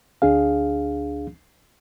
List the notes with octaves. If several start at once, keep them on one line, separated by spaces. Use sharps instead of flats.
D2 D4 G#4 F5